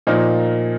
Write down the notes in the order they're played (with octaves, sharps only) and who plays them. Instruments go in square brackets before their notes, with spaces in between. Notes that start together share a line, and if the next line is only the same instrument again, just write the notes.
[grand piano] A#2 F3 A#3 D#4